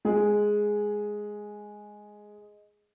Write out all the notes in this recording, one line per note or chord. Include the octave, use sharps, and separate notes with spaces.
G#3 G#4